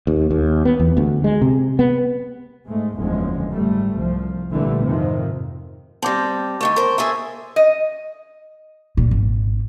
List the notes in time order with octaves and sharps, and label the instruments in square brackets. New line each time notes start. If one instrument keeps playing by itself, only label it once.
[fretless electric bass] D#2
D#2
B3
E2
D2
G#3
C3
B3
[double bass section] G#2 G#3 A3
F#1 E2 D3 F3 G#3
G#2 G3 A3
C2 F3
A#1 A#2 D3 E3 G3 A3
F2 G#2 C3 D#3 F3
[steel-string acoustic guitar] G3 C4 [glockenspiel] A5 D6 A#6
[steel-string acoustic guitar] D3 D#3 A3 [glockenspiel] C#6
[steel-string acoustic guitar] A#4 C5
G#4 A4 E5
[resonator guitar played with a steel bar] D#5
[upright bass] A#2
G#1